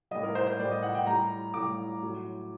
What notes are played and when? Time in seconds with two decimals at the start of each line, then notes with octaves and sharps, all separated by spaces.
0.11 A2 G3 D#5
0.23 A#4
0.35 C5
0.47 C5
0.59 A2 G3 D5
0.71 D#5
0.83 F#5
0.95 G5
1.06 A2 G3 A#5
1.54 A2 G3 D6
2.02 A2 F#3